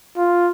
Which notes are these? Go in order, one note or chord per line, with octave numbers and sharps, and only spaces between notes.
F4